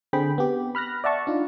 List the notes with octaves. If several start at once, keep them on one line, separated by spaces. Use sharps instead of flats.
D3 C4 G#4 G5 B5
B3 G4
B5 F6 F#6 A#6
D5 E5 F#5 A5 C#6
D4 D#4 F4